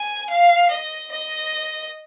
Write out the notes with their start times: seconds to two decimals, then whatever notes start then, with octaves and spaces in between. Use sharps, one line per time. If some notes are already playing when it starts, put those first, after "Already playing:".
Already playing: G#5
0.29 F5
0.71 D#5
1.11 D#5